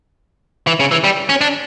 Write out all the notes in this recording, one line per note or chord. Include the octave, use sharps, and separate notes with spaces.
E3
C#3
E3
G3
C#4
D4